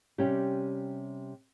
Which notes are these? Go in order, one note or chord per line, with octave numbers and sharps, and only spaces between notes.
C3 G3 C#4 G4